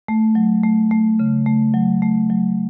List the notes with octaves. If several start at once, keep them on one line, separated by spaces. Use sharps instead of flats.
A3
F#3
A3
A3
C#3
A3
F#3
A3
F#3